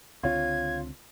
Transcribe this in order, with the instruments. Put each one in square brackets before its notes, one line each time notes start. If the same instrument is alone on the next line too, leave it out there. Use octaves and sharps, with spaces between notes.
[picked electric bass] C#2 D3 C4 [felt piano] F4 C#5 [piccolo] G#6